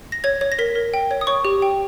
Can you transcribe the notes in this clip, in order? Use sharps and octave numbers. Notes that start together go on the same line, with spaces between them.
A#6
C#5 G#6
C#5
A#6
A#4 B6
A#4
G5
C#5
D#6
C#5 C#6
G4
G5